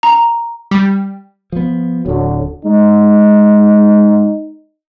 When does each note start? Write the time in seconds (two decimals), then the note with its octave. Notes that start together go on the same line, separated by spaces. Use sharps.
0.03 A#5
0.71 G3
1.52 F3 B3
2.06 D1 D3 F#3
2.65 G#3 D#4